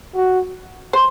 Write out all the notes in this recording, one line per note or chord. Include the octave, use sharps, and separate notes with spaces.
F#4
C5